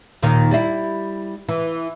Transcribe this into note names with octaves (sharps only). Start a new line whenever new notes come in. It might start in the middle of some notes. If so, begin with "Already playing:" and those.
D#2 A#2 D#3
G3 E4
E3